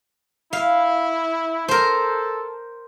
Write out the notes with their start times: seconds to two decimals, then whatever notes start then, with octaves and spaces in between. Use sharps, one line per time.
0.53 E4 F5
1.68 A4 A#4 C5